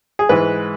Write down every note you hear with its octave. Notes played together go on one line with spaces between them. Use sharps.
G#4
G#2 E3 G#3 B4